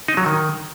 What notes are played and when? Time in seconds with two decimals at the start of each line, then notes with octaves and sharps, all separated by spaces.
0.08 D#4
0.17 F#3
0.26 D#3